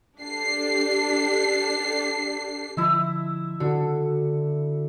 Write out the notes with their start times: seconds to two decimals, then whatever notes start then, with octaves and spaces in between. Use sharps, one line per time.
0.19 D4 G4 A4 C7
2.77 D3 F3 E4 E5
3.60 D3 F#4